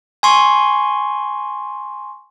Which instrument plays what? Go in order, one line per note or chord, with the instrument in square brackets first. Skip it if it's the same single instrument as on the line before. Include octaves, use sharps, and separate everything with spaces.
[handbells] G#5 C6 C#6